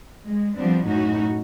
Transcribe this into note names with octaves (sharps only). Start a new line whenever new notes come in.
G#3
F3 G3 B3 C4 D4
F#2 A2 C#4 D#4 F#4